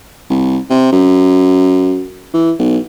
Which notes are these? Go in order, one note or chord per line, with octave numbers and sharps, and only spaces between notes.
C2
C3
F#2
E3
B1